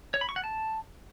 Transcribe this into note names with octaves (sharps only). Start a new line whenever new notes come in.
C#5
B5
C#6
F#5
A5